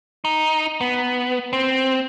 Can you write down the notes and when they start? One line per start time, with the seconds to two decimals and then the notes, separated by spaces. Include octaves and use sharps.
0.25 D#4
0.81 B3
1.53 C4